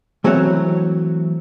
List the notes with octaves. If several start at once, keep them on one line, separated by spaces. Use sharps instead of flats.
E3 F#3 A3 C4 F#4 C#5